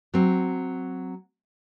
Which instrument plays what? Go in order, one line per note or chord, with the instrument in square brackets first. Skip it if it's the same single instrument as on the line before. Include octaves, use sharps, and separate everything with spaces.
[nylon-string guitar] F#3 C4